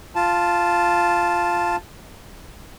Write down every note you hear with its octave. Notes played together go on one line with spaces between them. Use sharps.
F4 A5